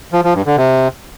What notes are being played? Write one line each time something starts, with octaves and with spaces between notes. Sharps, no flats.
F3
F3
G2
D3
C3